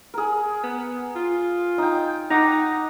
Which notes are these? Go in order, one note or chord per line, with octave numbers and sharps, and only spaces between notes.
G#4 A#4
B3
F4
D#4 G5
D#4 F#5 D6